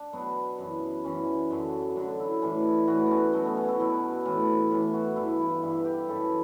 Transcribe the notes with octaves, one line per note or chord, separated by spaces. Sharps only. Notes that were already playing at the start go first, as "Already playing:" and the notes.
Already playing: D4
B2 F#3 B3
F#2 E3
F#2 E3 C#4
F#2 D3 F#3
F#2 D3 F#3 D4
E4
A2 E3 D4
A2 E3 F#4
B3 C#4
B2 F#3 A3
B3
C#4
E4
B2 F#3
A2 E3
A2 E3
F#4
G2 E3 E4
E4
G2 E3 E4
G4
F#2 C#3 E3 A4